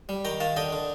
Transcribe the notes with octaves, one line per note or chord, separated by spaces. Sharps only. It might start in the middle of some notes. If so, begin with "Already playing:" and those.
G3
D#3 G5 A#5
D#3 F5 A5
D3 D#5 G5
D3